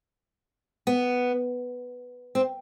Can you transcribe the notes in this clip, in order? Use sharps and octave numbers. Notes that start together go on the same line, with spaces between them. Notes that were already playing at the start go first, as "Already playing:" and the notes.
B3
C4